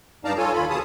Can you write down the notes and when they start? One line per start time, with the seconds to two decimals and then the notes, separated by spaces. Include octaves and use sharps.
0.25 G2 D#4 D5 F5 A5 A#5
0.37 F4 A4 C#5 G#5
0.54 D#2 F4 B5
0.70 B2 G#4 A5 D#6